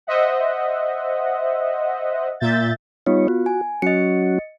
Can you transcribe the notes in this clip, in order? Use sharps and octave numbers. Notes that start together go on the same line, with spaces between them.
C5 D#5 E5 F#5
A#2 E5 G6 A6
G3 B3 D#4 F4 C#5
F#4
G#5
F#3 C#4 F#4 D#5 C#7